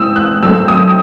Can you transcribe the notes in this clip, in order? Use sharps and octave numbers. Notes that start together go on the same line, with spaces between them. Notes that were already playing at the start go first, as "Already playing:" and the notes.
Already playing: G#2 E3 C4 D#6 E6
F#6
F#2 D#3 A3 C4 E6
D#6